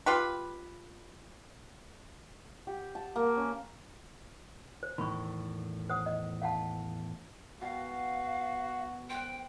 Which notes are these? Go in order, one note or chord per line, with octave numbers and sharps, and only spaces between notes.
F4 G4 B4
G4
A5
A#3
C#4
C5
E2 A2 D#3 B5 C#6
C5 F#5 D#6
D#5
F5 F#5 A5
B2 F#4 F5 G5
C5 F#5 G5